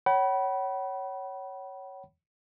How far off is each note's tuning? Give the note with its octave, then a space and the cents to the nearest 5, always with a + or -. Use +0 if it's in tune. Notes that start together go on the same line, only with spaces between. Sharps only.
C#5 +0 F#5 +45 B5 -20